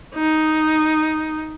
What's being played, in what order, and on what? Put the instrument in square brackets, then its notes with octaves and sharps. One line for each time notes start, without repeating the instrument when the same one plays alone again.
[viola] D#4